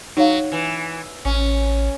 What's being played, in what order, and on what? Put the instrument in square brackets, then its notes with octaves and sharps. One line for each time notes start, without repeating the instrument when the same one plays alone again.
[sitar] F#3 [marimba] D#4 C#5 F5
[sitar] E3
[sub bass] A1 [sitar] C#4